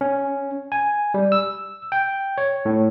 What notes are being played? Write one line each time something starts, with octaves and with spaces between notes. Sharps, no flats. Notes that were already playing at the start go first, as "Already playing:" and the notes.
C#4
G#5
G3
E6
G5
C#5
A2